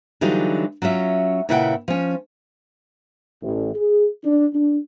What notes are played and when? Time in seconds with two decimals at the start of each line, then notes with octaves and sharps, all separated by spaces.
0.21 D3 E3 F#3 G3 D#4 F4
0.82 F#3 C#4 F4 E5
1.49 A#2 C#3 E4 B4 F#5 G5
1.88 F3 C#4
3.42 A1
3.75 G#4
4.24 D4
4.53 D4